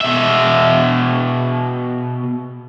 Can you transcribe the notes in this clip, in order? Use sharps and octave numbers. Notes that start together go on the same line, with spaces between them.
B2 E5